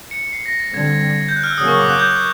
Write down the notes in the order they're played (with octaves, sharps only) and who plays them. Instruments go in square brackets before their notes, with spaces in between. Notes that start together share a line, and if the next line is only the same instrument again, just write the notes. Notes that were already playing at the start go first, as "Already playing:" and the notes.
[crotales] C#7
C7
A#6
A6
[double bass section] D3 G3 C4 [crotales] G#6
[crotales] G6
F#6
F6
E6
[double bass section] C#3 F#3 A#3 C#4 [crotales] D#6
[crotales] C#6
D6
F#6
G6